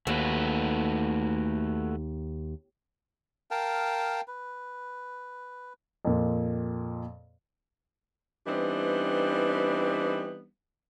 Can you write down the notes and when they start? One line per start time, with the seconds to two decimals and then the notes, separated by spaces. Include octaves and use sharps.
0.07 D#2 A3 F#4 B4
3.51 A#4 F5 G5 A5
4.28 B4
6.05 F2 A#2
8.46 E3 G3 B3 C4 D4 D#4